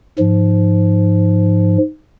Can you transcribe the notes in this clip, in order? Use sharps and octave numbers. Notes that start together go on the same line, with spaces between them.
G#2 F3